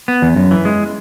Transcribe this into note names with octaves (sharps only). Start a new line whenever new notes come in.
B3
E2
F#2
E3
G#3